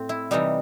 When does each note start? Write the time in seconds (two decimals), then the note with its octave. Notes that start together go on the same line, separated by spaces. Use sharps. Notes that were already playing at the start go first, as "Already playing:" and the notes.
Already playing: A2 C4
0.09 E4
0.31 C3 E3 G3 D#4